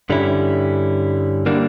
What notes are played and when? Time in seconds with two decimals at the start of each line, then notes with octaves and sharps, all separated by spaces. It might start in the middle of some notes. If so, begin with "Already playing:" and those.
0.10 G2 D3 G3 C#4 E4
1.46 D3 G3 A#3 D4